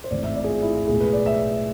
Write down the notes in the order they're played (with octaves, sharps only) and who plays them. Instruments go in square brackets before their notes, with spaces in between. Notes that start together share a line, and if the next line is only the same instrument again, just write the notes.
[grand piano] C5
A1 G#2 E3 A3 C4 D5
E5
D5
G#4
F4
E4
F4
B1 A2 G#3 G#4
B4
D5
E5